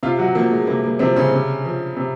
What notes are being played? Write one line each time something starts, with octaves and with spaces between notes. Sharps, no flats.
C3 F4 F5
F#3 F#4
F3 A#3
G#3
C3 A#3
A#3
C3 F3 C4
C#3 C#4
C3
F3
C3